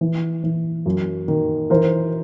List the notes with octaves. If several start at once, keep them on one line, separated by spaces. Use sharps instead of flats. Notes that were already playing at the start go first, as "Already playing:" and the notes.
E3
E3
F#2
D#3
E3 A#4 C5